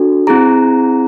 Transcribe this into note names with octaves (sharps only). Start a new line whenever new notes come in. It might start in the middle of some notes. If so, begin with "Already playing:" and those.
Already playing: D4 F#4 A4
C4 E4 G#4 A#5